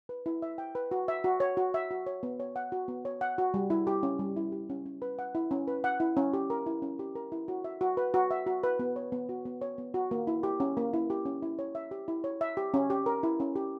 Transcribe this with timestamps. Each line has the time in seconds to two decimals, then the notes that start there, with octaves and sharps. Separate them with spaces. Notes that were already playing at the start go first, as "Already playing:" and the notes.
0.09 B4
0.26 E4
0.42 E5
0.58 G5
0.75 B4
0.91 F#4
1.08 E5
1.24 F#4
1.40 C#5
1.57 F#4
1.74 E5
1.91 F#4
2.06 C#5
2.23 B3
2.40 C#5
2.56 F#5
2.72 F#4
2.88 B3
3.05 C#5
3.21 F#5
3.38 F#4
3.54 G3
3.70 E4
3.87 G4
4.03 C#4
4.19 G3
4.36 E4
4.52 G4
4.70 C#4
4.86 C#4
5.02 B4
5.19 F#5
5.35 E4
5.51 C#4
5.68 B4
5.84 F#5
6.00 E4
6.17 C#4
6.33 G4
6.50 A#4
6.66 E4
6.82 C#4
6.99 G4
7.15 A#4
7.32 E4
7.48 F#4
7.64 E5
7.81 F#4
7.97 B4
8.14 F#4
8.31 E5
8.47 F#4
8.63 B4
8.79 B3
8.96 C#5
9.12 B3
9.29 F#4
9.45 B3
9.61 C#5
9.78 B3
9.94 F#4
10.11 A#3
10.27 E4
10.43 G4
10.60 C#4
10.77 A#3
10.93 E4
11.10 G4
11.25 C#4
11.42 E4
11.59 C#5
11.75 E5
11.91 G4
12.08 E4
12.24 C#5
12.41 E5
12.57 G4
12.74 C#4
12.90 G4
13.06 A#4
13.23 E4
13.40 C#4
13.56 G4